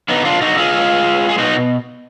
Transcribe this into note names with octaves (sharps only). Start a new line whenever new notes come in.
D3 B3 D#4
D4 F4
D3 D#4 F#4
F4 G#4
G#3
G#3
G#4
B2 D#4 F#4